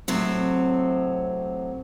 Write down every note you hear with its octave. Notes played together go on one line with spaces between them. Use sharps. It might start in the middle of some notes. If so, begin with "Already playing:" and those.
A2 C3 F#3 C4